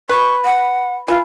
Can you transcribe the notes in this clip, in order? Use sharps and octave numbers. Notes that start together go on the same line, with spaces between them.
B4 C#6
F#5
E3 F4